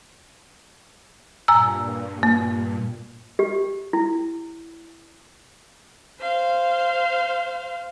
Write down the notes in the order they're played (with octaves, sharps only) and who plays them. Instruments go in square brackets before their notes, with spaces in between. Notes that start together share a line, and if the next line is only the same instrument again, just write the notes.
[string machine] G2 A#2 [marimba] G#5 A#5 E6
[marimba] A#3
[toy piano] G4
E4
[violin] C5 F5